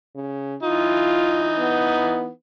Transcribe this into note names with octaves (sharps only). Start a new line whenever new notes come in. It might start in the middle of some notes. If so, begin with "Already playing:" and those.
C#3
E3 D#4 F4
B3